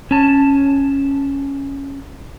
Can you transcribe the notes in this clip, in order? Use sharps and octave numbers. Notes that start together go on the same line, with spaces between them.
C#4 A5